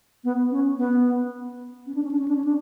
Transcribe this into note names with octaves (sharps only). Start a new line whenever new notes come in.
B3
C#4
B3
C#4
D4
C#4
D4
C#4
D4
C#4
D4